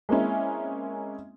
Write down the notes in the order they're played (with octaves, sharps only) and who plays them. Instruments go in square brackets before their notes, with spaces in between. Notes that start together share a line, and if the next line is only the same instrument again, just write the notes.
[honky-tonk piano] G#3 A#3 C4 C#4 E4